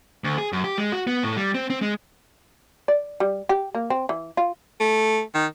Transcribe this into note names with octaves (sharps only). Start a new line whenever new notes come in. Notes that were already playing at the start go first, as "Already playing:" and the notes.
D2
G#4
F#2
G4
G#3
F#4
B3
A2
G3
C4
C4
G#3
D5
G3
G4
A#3
C4
E3
F4
A3
D#3